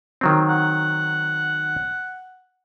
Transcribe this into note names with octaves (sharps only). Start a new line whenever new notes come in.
D#3 F#3 C4
F#5